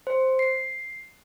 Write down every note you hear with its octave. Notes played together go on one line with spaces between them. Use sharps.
C5
C7